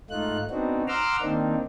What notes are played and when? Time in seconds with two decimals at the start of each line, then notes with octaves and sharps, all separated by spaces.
0.10 G#2 A3 D#4 F4 F#6
0.50 B3 C4 D4 D#4 F#4
0.88 F#5 A#5 C6 D6 E6 F6
1.21 D#3 A#3 C4 D4 D#4